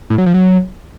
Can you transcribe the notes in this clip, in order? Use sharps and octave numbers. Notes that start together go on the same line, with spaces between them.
A2
F#3
F3
F#3